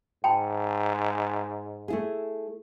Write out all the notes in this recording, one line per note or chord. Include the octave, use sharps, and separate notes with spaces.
G#2 G5 A5 B5
A3 E4 G#4